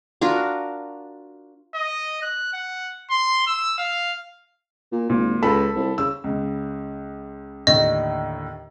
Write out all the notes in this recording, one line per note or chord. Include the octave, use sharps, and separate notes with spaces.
D4 F4 F#4 A#4
D#5
F#6
F#5
C6
E6
F5
A#2
G#1 A#2
C#2 A4 A5 B5
C2
C#3 E6
C#2 C#3
D#2 A2 D3 D#5